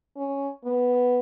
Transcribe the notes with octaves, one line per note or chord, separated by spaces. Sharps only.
C#4
B3